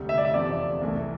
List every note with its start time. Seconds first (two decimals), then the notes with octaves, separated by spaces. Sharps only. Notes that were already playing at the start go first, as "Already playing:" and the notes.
Already playing: E1 D2 C3 G3
0.09 E5
0.18 D5
0.25 E5
0.34 F1 E2 C3 F3 D5
0.81 C2 C3 E3 A3